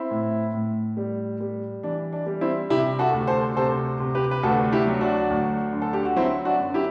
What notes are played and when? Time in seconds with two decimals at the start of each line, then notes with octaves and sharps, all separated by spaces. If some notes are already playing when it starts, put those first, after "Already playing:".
Already playing: C4 E4
0.11 A2
0.53 A2
0.97 G3
1.40 G3
1.83 E3 D4
2.13 D4
2.27 G3
2.41 C4 E4
2.70 C3 E4 G4
2.99 F#4 A4
3.13 D2
3.27 A4 C5
3.56 C3 A4 C5
4.00 C3
4.15 G4 B4
4.31 B4
4.43 D2 F#4 A4
4.72 E4 G4
4.87 F#3
5.01 D4 F#4
5.30 D2
5.73 D3
5.82 A4
5.93 G4
6.05 F#4
6.16 F#3 C4 E4
6.45 D4 F#4
6.60 F#2
6.74 E4 G4